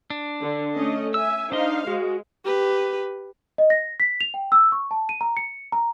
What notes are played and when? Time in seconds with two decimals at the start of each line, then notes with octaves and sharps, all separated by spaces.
0.10 D4
0.42 D3
0.74 A3 C#4 D#5
1.14 E5 G#5 E6
1.52 D4 D#4 C5 D#5 F5
1.87 G#3 F#4
2.45 G4 B4
3.58 D#5
3.70 A#6
4.00 B6
4.21 F7
4.34 G5
4.52 E6
4.72 C#6
4.91 A5
5.09 D#7
5.21 A#5
5.37 C#7
5.72 A#5